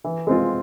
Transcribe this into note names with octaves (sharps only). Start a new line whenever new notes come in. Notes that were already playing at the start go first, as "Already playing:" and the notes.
E3
G#3 C4 F4